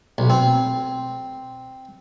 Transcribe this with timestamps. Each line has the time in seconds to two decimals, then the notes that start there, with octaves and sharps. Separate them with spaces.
0.18 B1
0.30 C4